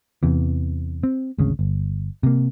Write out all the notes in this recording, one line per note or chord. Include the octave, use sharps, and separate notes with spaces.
E2 C3 E3
C4
G#1 D2 C#3
G1
C3 A#3